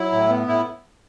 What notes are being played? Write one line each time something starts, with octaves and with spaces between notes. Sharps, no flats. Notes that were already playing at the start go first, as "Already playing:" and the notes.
Already playing: F#3 E4
A2
B3
A2 E4